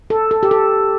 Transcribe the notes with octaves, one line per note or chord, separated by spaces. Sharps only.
A4
A4
G4
A4